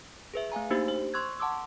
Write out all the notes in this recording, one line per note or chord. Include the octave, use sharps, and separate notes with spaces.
G#4 B4 E5
A3 F5 G#5 A#5
A#3 D4 D#4 F#4 G4 C5
C5
C6 C#6 E6 F#6 G#6
F#5 A5 C6 D6 E6